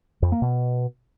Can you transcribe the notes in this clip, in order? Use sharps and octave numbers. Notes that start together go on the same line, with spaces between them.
F2
A#3
B2